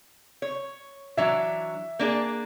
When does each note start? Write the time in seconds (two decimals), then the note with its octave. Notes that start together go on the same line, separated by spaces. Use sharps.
0.42 C#5
1.17 E3 F#3 D4 E5
1.99 A#3 D4 G#4